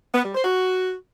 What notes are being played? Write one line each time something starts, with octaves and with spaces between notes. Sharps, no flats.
B3
G3
C5
F#4